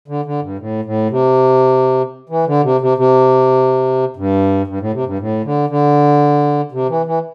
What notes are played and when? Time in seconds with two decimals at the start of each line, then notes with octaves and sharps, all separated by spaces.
0.08 D3
0.25 D3
0.42 G2
0.59 A2
0.85 A2
1.10 C3
2.29 E3
2.46 D3
2.63 C3
2.81 C3
2.98 C3
4.16 G2
4.67 G2
4.80 A2
4.93 C3
5.06 G2
5.19 A2
5.44 D3
5.70 D3
6.72 C3
6.89 E3
7.06 E3